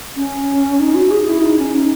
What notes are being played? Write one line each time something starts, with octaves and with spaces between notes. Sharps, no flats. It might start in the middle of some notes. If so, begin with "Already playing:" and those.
C#4
D#4
F#4
G#4
E4
D#4
C#4
D#4